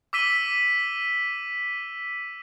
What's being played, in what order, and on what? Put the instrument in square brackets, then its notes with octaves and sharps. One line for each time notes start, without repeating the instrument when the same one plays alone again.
[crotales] D6 E6 B6 D#7 G7